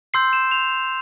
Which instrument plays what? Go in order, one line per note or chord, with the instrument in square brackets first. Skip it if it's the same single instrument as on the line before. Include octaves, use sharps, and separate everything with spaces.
[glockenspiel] C6 E6 G6 C7
E7
F7